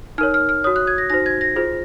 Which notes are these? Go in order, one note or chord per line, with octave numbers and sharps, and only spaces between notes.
D#4 A#4 C#5 F6
F6
F6
F#4 C#5 D#6
F#6
G#6
A#6
D#4 F#4 C5 A#6
G#6
A#6
F4 G#4 C5